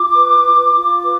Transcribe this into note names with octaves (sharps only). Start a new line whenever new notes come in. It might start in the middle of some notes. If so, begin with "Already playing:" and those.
Already playing: F4 D6
B4
F4
F4
B4